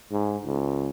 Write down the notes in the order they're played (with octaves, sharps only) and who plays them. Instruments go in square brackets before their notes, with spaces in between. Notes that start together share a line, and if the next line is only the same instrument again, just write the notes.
[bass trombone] G#2
C#2